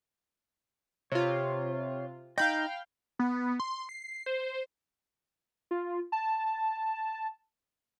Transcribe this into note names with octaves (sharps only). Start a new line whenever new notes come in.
C3 F4 C#5
D#4 D#5 F5 G5 B5 G6
B3
C6
C7
C5
F4
A5